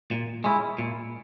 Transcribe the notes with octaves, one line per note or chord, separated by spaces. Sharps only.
A#2
G#3 C#4 E4
A#2